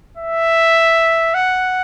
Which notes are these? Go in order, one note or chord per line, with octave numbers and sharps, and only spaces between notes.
E5
F#5